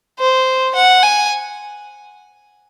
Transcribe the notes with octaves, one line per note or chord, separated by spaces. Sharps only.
C5
F#5
G#5